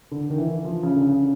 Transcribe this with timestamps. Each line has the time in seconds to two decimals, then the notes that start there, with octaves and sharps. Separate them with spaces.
0.11 D3
0.30 D#3
0.38 E3
0.65 F3
0.83 C#3
0.96 D3
1.01 C#3